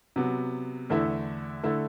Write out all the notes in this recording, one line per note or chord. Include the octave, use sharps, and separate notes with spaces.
C3 F#3 B3
E2 D3 A3 E4
D3 A3 E4